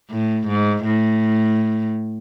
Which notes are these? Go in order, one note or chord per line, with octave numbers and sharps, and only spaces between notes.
A2
G#2
A2